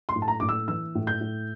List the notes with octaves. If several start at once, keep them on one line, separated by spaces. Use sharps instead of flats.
C6
A2
A5
A#5
A2 D6
E6
E3 E6
A2
G6
A2